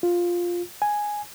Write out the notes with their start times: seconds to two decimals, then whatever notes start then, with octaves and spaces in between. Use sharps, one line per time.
0.03 F4
0.82 G#5